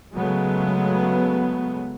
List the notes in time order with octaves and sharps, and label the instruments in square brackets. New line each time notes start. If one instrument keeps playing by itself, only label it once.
[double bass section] C#3 F#3 G#3 A3 B3